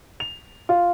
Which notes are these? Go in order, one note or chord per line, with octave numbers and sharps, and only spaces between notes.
F7
F4